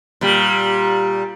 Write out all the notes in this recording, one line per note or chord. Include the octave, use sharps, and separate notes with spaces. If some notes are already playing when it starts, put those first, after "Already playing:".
A#2 G3